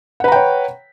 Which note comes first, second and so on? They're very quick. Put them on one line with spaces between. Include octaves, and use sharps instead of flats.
F#5 B4 A#5 G5 C#5